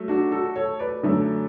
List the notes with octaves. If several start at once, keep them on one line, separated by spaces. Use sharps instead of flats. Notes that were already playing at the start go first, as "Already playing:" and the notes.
Already playing: F#3 A3
D4 F#4
F#4 A4
A4 C#5
B4 D5
F#2 D3 F#3 A3